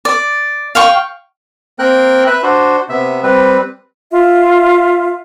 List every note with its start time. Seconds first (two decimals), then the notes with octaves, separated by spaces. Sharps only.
0.05 D5
0.75 F5 G5 C#6
1.79 A#3 C4 A#4 G5 F#6
2.27 B4 E5 F#6
2.43 D4 F#4 C5
2.89 C3 B3 E5
3.23 G3 C4 B4
4.12 F4 E5